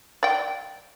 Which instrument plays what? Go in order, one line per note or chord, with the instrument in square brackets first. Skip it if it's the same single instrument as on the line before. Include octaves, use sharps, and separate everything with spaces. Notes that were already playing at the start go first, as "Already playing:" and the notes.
[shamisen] D5 G5